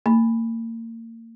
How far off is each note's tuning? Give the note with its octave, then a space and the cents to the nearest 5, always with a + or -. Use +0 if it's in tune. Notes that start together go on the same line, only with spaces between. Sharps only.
A#3 -35 B5 +0